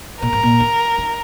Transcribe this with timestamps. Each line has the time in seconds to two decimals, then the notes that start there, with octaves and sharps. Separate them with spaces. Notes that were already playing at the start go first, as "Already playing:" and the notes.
0.22 A#2 A#4
0.33 G#2
0.43 A#2
0.60 D#3
0.98 D#3